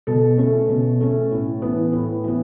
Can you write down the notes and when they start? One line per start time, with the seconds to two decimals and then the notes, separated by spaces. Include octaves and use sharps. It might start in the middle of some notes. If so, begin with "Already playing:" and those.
0.07 B2 A4
0.38 A3 C#4
0.69 B2
1.01 A3 C#4
1.31 A2
1.62 E3 B3
1.92 A2
2.24 E3 B3